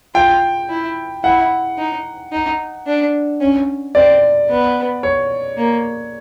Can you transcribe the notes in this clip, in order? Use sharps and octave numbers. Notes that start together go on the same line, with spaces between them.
F4 G5
E4
E4 F#5
D#4
D#4
D4
C#4
C4 D5
B3
C#5
A#3